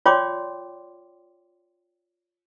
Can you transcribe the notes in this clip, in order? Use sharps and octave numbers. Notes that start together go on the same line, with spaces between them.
F4 C#5 D5 G5 C6 D6